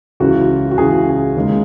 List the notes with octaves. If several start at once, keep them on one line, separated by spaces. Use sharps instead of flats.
C#2 C#3 E3 F#4
F#4
C#2 C#3 E3 G#4
D#2 C#3 G#3 D#4